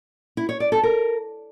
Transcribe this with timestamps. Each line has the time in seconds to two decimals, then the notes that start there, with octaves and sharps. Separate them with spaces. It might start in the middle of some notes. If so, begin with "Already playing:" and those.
0.37 E4
0.49 C#5
0.60 D5
0.72 A4
0.83 A#4